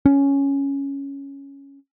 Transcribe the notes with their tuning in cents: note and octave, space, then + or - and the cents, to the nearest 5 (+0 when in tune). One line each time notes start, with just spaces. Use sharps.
C#4 +0